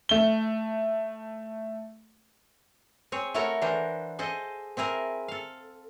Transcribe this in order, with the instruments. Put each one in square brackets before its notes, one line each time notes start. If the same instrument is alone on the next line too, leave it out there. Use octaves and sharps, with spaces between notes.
[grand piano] A3 G7
[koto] C4 G#4 C#5
A3 E4 F#4 A4 A#4 C#5
E3 D4 A#4 C5
G#4 A4 C5 D#5
C4 E4 G#4 A#4
A4 F5